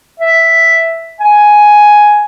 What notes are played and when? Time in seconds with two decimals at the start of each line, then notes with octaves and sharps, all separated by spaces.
0.20 E5
1.21 G#5